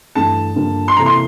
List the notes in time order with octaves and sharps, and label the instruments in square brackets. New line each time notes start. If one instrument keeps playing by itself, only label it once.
[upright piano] G2 E3 A3 [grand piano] A5
[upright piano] G2 D3 F3 A#3
[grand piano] C6
[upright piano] C3 E3 A#3 E4 A4 [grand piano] A#5
[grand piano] C6